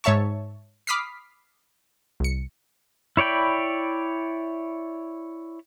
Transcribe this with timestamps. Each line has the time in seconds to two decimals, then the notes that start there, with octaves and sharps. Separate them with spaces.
0.04 G#2 C#5 E5 A5 C#6
0.87 B5 D6 D#6 F6 B6 C7
2.20 C2 C#7
3.17 E4 C#5 D5 G5 B5